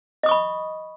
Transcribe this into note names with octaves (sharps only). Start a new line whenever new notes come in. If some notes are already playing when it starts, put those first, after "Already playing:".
D#5 B5 C#6 D#6